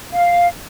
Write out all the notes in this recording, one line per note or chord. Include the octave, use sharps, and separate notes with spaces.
F5